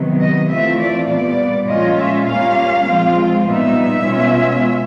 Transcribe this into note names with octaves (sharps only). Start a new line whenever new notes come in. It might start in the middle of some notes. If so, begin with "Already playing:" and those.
Already playing: C3 D#3 F#3 B3
D#5
E3 A3 C4 F4 E5
D5
A#2 G3 B3 D5
A#2 F3 G#3 C#4 F4 D#5
E5
A#2 G3 A#3 C#4 F4 F5
F3 G#3 C4 F4
A#2 G3 B3 D#4 E5
B2 G#3 C#4 F4